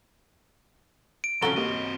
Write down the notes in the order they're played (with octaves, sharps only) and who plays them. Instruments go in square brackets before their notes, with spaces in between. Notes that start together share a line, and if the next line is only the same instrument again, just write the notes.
[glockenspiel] D7
[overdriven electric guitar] C2 F3 [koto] C#4 F#4 [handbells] A4 A#5 A6 [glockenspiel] G7
[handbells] A#3 G4 A#4 [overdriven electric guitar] C4 D#5